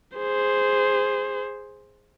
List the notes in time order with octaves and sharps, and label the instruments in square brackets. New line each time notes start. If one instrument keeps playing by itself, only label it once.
[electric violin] G#4 C5